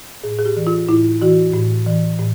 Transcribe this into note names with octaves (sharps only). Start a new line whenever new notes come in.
A2 G#4
G#4
G4
E3
F4
A2 E4
E3 F#4
A2
E3
A2